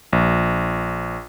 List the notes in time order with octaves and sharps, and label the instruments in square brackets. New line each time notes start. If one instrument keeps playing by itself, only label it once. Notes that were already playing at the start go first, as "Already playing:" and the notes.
[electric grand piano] A#1